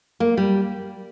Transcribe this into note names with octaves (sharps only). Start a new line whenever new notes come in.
A#3
G3